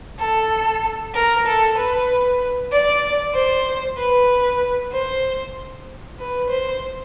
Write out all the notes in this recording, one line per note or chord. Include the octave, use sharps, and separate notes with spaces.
A4
A#4
A4
B4
D5
C5
B4
C5
B4
C5